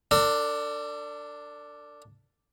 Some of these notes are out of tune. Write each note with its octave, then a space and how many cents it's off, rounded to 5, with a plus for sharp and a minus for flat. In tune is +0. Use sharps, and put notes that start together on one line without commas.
D4 +0 A4 +45